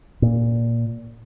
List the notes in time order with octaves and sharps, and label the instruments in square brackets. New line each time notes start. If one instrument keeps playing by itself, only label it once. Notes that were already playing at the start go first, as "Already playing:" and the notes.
[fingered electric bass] A#2